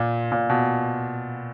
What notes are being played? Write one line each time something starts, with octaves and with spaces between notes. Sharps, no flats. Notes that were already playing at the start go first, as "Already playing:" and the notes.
Already playing: A#2
A#2
B2